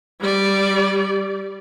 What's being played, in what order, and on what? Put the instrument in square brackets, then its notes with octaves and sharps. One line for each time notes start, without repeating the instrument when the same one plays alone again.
[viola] G3 D5